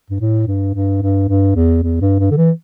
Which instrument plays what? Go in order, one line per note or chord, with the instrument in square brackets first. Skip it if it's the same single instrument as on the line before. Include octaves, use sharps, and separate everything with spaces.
[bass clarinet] G2
A2
G2
G2
G2
G2
E2
E2
G2
G2
D3
E3